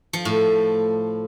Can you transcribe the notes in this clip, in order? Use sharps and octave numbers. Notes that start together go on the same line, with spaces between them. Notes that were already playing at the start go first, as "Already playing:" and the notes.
F3
A2